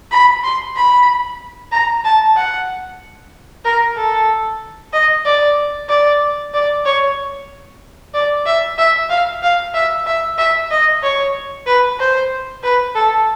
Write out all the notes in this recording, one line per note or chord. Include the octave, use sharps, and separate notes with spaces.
B5
C6
B5
A#5
A5
F#5
A#4
A4
D#5
D5
D5
D5
C#5
D5
E5
E5
F5
F5
E5
E5
E5
D#5
C#5
B4
C5
B4
A4